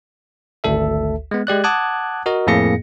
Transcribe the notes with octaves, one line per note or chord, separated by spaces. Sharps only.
G#1 D2 A4 E5
G#3 B3
G#3 G4 D5 F#6
F#5 A5 D6 D#6 F#6 G#6
F#4 A#4 D#5
F2 A2 A#3 G#4 A#6 C#7